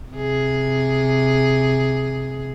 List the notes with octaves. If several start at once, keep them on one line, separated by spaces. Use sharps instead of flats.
C3 G#4